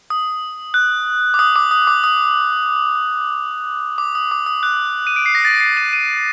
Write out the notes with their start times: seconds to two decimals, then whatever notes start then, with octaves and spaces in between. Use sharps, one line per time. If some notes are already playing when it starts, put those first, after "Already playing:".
0.10 D#6
0.74 F#6
1.34 D6
1.39 D#6
1.56 D6
1.71 D#6
1.87 D6
2.04 D#6
3.98 D6
4.15 D#6
4.31 D6
4.46 D#6
4.63 F#6
5.07 D#7
5.16 D7
5.26 C7
5.35 A#6
5.45 A6
5.60 C7
5.77 D#7
5.93 D#7